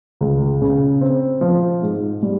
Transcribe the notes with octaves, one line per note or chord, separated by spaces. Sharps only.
C#2
C#3
C4
F3
G#2
G3